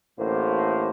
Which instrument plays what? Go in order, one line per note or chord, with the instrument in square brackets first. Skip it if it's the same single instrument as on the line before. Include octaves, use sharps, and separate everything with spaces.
[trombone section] A1 A2 D3 A#3 C5